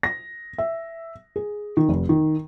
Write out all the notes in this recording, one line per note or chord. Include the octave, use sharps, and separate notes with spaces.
A#6
E5
G#4
D#3
F1
D#3